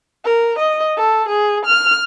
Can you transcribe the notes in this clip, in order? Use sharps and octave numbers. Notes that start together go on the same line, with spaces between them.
A#4
D#5
A4
G#4
F6